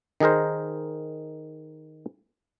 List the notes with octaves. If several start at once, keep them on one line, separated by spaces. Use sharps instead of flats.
D#3 D#4 G#4 A#4 C5